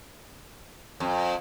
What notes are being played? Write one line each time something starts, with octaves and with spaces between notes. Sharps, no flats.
F2